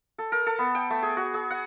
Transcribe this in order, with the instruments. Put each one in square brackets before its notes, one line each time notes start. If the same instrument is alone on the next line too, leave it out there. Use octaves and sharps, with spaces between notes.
[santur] A4
A#4
A4
B3
G5
A3
G#4
F#4
G#4
F#5